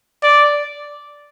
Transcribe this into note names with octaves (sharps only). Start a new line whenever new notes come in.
D5